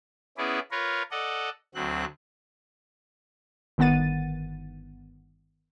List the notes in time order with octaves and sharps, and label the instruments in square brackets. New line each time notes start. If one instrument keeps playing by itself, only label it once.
[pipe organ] B3 C#4 E4 G#4 B4 D5
F4 A#4 B4 C#5
A4 D5 D#5 F#5
D2 F#3 C4 F#6
[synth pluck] G1 D#3 B3 F#5 A6 D#7